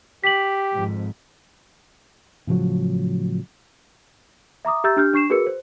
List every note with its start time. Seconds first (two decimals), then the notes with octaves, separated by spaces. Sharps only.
0.24 G4 B6 F#7
0.73 G#1 F2 G#2
2.47 A2 C#3 F3 F#3
4.65 E5 A#5 D6 D#6
4.84 G4 E5 A#5 E6 G6 A6
4.96 D4 G4 F6 G6
5.14 D4 C#6 C7 E7
5.30 F#4 G#4 A#4 B4 E6 C#7
5.47 C5